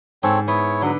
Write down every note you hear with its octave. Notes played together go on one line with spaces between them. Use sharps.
G#2 C4 A4 C#5
B3 E4 C#5
D3 F#3 B4